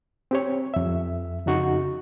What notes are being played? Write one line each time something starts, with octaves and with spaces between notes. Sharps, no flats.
C4 G4 C#5
F2 E5
F2 C#3 D#4 F#4 C#6